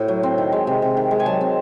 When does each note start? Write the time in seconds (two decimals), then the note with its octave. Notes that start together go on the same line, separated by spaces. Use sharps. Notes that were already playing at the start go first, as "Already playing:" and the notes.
Already playing: A2 F#4 A4 C5
0.08 F#3
0.23 C4
0.38 D#3
0.52 G#3
0.67 C3
0.82 C3
0.97 D#3
1.11 G#3
1.20 G#5
1.26 F#3 A5
1.41 C4